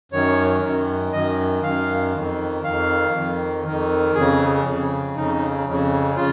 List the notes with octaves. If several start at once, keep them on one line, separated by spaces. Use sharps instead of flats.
F#2 D#3 C#5
F#2 D#3
F#2 D#3 D#5
F#2 D#3 F5
F2 D#3
F2 D#3 F5
F2 D#3
F2 D#3
F2 C#3 G#4
F2 C#3
F2 C#3 D#4
F2 C#3
C#3 F4